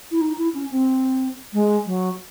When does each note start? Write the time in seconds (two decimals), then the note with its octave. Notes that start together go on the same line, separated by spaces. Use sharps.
0.11 E4
0.21 D#4
0.38 E4
0.54 C#4
0.71 C4
1.53 G#3
1.86 F#3